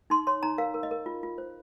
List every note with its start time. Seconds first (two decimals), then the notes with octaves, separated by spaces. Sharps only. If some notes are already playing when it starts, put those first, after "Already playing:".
0.10 D#4 C6
0.27 C#5 C6
0.43 D#4 A#5
0.58 A#4 F5
0.74 A#4
0.83 D#5
0.91 A#4
1.06 F4
1.23 F4
1.38 C5